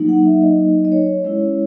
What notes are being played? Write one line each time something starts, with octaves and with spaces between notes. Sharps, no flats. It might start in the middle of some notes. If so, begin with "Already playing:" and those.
Already playing: F#3 A#3 D#4
F#5
E5
D#5
D#5
C#5
G#3 C#4 E4